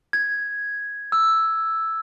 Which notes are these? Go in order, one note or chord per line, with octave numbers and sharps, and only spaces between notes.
G#6
E6